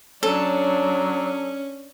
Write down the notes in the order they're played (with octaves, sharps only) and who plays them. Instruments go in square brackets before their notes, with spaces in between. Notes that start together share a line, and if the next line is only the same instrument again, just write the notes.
[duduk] F#3 [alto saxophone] C#4 [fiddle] D4 [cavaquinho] A4